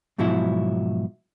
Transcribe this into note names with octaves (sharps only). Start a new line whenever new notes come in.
G#2 B2 F3 F#3 E4